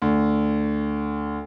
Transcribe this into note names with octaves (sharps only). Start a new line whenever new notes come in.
D2